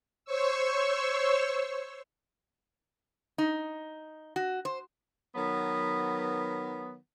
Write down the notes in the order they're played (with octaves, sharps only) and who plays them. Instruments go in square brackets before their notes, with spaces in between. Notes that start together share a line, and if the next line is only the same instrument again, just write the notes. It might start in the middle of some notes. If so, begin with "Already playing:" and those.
[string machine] C5 C#5 C#6 E6
[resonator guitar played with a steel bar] D#4
F#4
C5
[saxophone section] D#3 F#3 B3